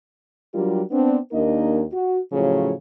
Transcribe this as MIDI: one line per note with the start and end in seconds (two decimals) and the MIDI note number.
0.54 0.81 54
0.54 0.81 55
0.54 0.81 62
0.54 0.81 65
0.54 0.81 67
0.54 0.81 70
0.90 1.17 59
0.90 1.17 60
0.90 1.17 62
1.32 1.82 39
1.32 1.82 58
1.32 1.82 62
1.32 1.82 63
1.32 1.82 70
1.32 1.82 75
1.92 2.19 66
2.32 2.72 45
2.32 2.72 49
2.32 2.72 53
2.32 2.72 54
2.32 2.72 68
2.32 2.72 73